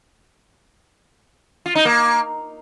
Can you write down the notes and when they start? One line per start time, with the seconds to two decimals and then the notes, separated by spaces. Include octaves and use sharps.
1.66 F4
1.75 D#4
1.85 A#3